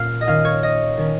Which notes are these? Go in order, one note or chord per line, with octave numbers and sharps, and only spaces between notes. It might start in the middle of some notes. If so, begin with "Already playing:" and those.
Already playing: A#2 A#3 C#4 F5
D#5
D#3 C#4 F5
C#5
D#5
D#3 C#4